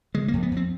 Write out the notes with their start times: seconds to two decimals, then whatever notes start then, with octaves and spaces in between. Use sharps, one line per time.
0.15 C#3 G#3
0.28 A#3
0.33 F2
0.43 B3
0.52 F2
0.57 C4